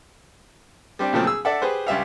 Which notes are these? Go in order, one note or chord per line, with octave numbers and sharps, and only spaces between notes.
G3 C4 D4
A#2 C#3 F3 F#3 A3 C4
G#4 E6
A4 D5 E5 F#5
G4 G#4 B4 C5
C#2 G3 E5 F5